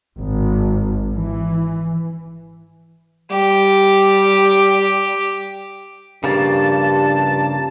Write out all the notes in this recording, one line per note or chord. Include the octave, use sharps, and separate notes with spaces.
G#1
E3
G3 G4
G2 C#3 F3 A#3 A5